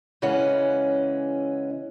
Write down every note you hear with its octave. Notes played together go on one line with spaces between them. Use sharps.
C#3 E3 G#3 C#4 F#5